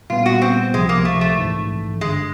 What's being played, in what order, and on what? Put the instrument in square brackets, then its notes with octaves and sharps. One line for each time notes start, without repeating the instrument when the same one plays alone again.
[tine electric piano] A#2 G3 B3 [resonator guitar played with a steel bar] F4
[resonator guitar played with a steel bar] F#4
C4
[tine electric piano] C#2 C3 F3 [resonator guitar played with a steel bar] G#3
[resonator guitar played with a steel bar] A#3
A3
A3
[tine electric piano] A#1 G#2 E3
[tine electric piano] G1 G2 D3 [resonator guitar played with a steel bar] G#3